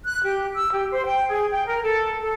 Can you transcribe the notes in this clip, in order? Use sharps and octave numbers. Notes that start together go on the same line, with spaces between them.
F#6
G4
E6
G4
C5
G5
G#4
G5
A#4
A4
A4